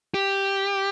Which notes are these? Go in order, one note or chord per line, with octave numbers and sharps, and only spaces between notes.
G4